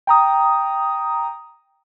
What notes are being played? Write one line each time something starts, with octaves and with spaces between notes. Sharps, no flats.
G5 A#5 D#6